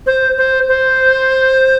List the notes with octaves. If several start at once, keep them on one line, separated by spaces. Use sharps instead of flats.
C5
C5
C5